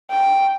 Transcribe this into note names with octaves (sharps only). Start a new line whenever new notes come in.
G5